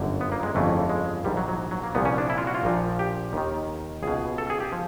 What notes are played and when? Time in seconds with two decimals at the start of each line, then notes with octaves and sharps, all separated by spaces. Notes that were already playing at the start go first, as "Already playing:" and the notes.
Already playing: G1 F#2 D3
0.21 B3
0.32 A#3
0.43 G#3
0.55 G1 F2 C#3 E3 A3
0.90 G#3
1.24 A#1 G#2 F3 G3
1.37 F#3
1.49 F#3
1.71 F#3
1.83 A#3
1.95 C2 A#2 F3 B3
2.05 C#4
2.18 D4
2.30 E4
2.38 F4
2.47 F#4
2.55 F4
2.63 A#1 A#2 F3
2.99 G4
3.33 D#2 D#3
4.03 C#2 B2 G#4
4.38 A4
4.50 G#4
4.60 G4
4.72 F3